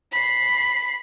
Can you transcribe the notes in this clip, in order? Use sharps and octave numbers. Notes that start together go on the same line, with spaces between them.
B5 C7